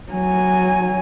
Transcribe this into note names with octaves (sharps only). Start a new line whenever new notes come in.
F#3 G#5